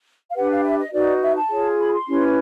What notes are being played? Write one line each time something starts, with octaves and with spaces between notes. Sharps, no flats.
F5
D4 G4 B4 F#5
F5
E5
D#5
D#4 F#4 B4 D5
E5
A5
F4 G#4 C#5
B5
C6
C#4 E4 G4 B4